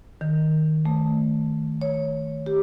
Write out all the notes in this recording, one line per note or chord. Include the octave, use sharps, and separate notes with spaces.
D#3
A3
C#5
G4